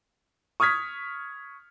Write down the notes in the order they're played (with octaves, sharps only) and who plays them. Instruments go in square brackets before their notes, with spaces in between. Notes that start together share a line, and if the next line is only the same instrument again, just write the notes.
[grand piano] C#6 D#6 F6 G#6 B6